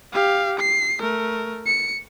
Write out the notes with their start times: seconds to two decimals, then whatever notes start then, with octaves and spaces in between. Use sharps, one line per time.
0.13 G4 F5
0.60 C7
1.00 A3 A#4
1.66 C#7